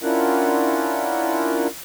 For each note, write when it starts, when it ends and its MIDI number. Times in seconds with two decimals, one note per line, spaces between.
0.02 1.67 61
0.02 1.67 62
0.02 1.67 64
0.02 1.67 65
0.02 1.67 70
0.02 1.67 78